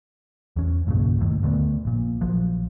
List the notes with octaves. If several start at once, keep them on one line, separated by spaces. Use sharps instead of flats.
E2 C#4
B1 G2 A#2 C#3
F#1 D#2 A2
D2 D3 A3 B3
A#1 A#2
A#1 F3 F#3